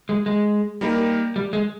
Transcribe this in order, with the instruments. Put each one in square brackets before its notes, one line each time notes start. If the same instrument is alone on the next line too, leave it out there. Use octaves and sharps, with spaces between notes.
[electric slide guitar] G#3
G#3
[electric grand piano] G3 A#3 D#4 G4 A#4
[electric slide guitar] G3
G#3